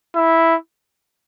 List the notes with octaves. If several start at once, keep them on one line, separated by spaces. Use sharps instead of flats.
E4